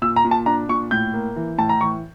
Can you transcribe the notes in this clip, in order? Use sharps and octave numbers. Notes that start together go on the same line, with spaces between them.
A#2 E6
A#5
A#2
A5
D4 A#5
A#2 C#6
A2 G6
A#3
E3
A2 A5
A#5
E3 C#6